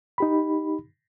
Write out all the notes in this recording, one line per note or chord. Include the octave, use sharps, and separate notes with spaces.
D#4 G4 B5